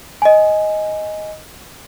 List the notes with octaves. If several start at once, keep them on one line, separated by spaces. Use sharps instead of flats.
D#5 G#5